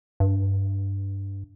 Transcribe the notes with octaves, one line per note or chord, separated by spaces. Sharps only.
G2